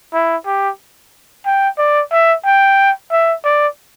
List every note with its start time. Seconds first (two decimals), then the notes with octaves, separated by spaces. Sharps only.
0.13 E4
0.46 G4
1.46 G5
1.78 D5
2.12 E5
2.45 G5
3.11 E5
3.44 D5